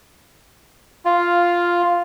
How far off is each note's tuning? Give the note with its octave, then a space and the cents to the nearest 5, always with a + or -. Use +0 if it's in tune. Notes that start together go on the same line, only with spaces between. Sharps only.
F4 +0 F5 +0